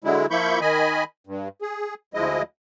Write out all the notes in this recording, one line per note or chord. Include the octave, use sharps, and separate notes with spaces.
D3 F#3 G#3 E4
F3 A#3 E4 B5 C#6 G6
D#3 D#5 G#5 B5
G2
G#4
D2 F3 G#3 E4 D#5